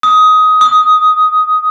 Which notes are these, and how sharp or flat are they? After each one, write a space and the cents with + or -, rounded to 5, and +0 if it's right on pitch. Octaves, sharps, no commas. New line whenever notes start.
D#6 +15
D#6 +5